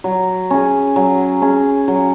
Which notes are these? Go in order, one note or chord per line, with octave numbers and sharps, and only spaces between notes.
F#3
C#4 G#4
F#3
C#4 G#4
F#3